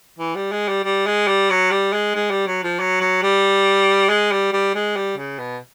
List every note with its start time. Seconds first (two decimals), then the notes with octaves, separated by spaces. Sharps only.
0.19 E3
0.35 G3
0.52 G#3
0.68 G3
0.84 G3
1.06 G#3
1.27 G3
1.50 F#3
1.71 G3
1.93 G#3
2.15 G#3
2.30 G3
2.47 F#3
2.63 F3
2.79 F#3
3.00 F#3
3.22 G3
4.09 G#3
4.32 G3
4.53 G3
4.75 G#3
4.96 G3
5.17 C#3
5.39 B2